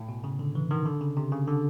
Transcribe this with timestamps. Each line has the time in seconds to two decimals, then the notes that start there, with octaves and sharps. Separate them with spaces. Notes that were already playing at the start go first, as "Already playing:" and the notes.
Already playing: A2
0.09 B2
0.24 C#3
0.39 D3
0.55 E3
0.71 D#3
0.86 D3
1.01 C#3
1.17 C3
1.32 C#3
1.47 D3